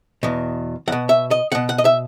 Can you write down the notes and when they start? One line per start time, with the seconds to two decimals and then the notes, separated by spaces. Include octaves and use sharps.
0.23 E2 B2
0.88 E2 B2 F#5
1.09 E5
1.31 D#5
1.52 E2 B2 F#5
1.69 F#5
1.78 D#5
1.85 E5